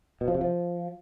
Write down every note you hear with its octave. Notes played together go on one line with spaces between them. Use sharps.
B2
F3
C3
F3